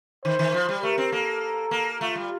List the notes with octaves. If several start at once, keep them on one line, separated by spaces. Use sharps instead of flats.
D#3 C5
D#3
F3
G3
A3 A#4
C4
A#3 A4
A#3
A3 F4
G3